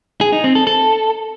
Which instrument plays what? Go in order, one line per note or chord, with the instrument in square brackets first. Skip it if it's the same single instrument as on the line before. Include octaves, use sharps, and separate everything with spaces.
[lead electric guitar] G#4
D#4
C4
A4
A4